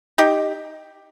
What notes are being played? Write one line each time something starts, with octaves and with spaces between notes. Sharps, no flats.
D#4 G4